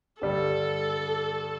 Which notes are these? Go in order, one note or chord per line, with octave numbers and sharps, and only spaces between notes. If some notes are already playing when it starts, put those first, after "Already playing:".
G2 D3 G3 A4